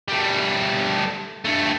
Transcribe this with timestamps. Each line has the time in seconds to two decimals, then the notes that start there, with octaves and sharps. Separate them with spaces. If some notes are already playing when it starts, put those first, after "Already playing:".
0.08 G3 A3
1.45 G2 A3